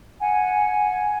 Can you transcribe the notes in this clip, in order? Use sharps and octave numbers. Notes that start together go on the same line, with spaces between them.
F#5 G#5